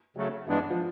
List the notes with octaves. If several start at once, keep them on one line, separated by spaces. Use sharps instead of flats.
C#3 F#3 A3
G2 E3 G#3 B3 D4
F3